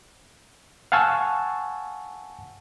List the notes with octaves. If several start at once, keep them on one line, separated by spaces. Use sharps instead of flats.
F5 F#5 G#5 A5 C#6 E6